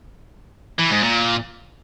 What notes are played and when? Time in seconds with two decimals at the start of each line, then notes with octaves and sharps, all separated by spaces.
0.79 E3
0.91 G#2
1.03 A#2